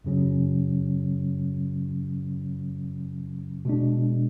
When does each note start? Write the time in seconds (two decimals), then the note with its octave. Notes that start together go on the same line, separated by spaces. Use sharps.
0.04 F#2 C#3 F#3 C#4
3.65 B2 G#3 D4